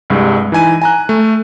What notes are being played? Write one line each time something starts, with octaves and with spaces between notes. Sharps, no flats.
C2 G2 G#3
E3 D#4 G#5 D#7
G#5 A#5 F#6
A3